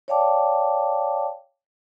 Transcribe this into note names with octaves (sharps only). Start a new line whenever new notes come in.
C#5 D5 F5 G5 A5 D6